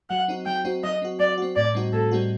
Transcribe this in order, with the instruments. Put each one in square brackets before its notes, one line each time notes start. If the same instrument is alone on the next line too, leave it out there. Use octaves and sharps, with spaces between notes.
[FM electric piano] F#3 [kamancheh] F#5
[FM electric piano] C4 D#4 F#4
[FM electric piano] F#3 [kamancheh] G5
[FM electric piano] C4 D#4 F#4
[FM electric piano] F#3 [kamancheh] D#5
[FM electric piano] C4 F#4
[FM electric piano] F#3 [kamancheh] D5
[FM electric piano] C4 F#4
[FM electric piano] A2 [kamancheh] D5
[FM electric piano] G3 C4 D#4 F#4
[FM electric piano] A2 [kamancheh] A4
[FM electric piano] G3 C4 D#4 F#4